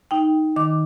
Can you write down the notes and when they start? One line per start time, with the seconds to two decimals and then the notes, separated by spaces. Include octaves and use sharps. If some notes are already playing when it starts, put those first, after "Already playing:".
0.11 D#4 G5
0.56 D#3 D6